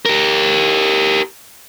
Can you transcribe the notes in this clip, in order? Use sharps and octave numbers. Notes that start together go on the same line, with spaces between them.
G4 A#4